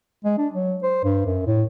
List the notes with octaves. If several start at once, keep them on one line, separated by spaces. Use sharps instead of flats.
G#3
D4
F#3
C5
G2
F#2
A2